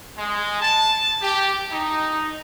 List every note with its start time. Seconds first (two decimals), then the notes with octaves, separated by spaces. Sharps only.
0.17 G#3
0.62 A5
1.22 G4
1.71 D#4